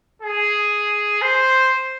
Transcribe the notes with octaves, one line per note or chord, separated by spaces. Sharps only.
G#4
C5